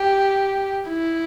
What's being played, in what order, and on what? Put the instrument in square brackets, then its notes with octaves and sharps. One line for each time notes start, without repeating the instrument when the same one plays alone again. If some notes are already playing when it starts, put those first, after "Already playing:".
Already playing: [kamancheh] G4
E4